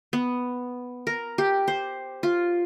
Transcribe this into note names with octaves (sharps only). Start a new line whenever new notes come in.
B3
A#4
G4
C5
F4